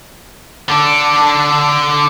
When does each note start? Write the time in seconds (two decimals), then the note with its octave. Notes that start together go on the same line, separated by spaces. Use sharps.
0.68 D3 D4